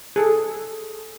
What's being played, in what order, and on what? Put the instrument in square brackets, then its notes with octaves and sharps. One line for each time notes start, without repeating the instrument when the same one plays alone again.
[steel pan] G#4 A4